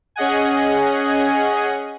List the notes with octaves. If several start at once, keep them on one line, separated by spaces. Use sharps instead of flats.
C#4 G#4 D#5 F#5 G#5